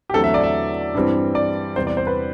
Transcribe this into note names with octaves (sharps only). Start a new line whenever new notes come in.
G4
E2 D3 F#3 A3 C4 A4
E5
D5
E5
G2 E3 G3 C4
D5
E2 C3 G3 C4 C5
D5
C5
B4